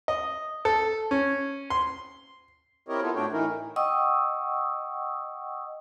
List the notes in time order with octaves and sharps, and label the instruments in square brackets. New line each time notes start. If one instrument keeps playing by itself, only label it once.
[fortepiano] D#5
A4
C#4
C6
[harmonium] C4 E4 G4 A#4 C#5 D#5
B3 E4 F4 A4
A2 A3 D4 F#4 C#5 G5
A2 E3 D#4 E4 A#4
[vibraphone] D#5 F#5 G5 C#6 D#6 E6